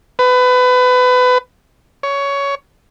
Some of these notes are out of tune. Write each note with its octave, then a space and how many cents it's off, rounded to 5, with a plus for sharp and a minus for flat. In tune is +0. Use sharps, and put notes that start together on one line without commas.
B4 +25
C#5 +15